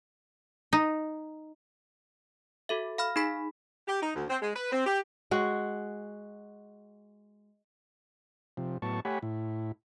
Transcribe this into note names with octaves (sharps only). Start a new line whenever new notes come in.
D#4
F#4 A4 E5
F5 B5 F6
D#4 G#4 B5 B6
G4
D#4
D2
C4
G#3
B4
C4
G4
G#3 F#4
C3 F3
A2 F#3 B3 A5 C#6
A3 G4 C#5 F#5 G#5 B5
A2 E4